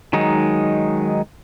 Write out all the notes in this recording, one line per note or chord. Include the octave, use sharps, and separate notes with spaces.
D#3 F#3 G#3 D#4